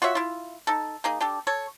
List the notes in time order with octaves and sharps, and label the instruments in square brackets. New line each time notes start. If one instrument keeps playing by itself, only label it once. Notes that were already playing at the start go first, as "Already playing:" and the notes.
[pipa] F4 F#4 C#5 E5
E4 F4
D#4 A4
A#3 D#4 G#4
D4 G4 A4
A4 C#5